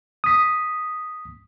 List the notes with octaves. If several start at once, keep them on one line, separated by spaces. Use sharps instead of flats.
D#6 B6